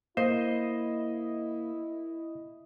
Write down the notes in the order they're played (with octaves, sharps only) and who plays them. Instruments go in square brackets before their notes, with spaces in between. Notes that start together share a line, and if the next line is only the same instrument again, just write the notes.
[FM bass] A#3 [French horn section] E4 [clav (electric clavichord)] C5 [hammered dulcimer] D#5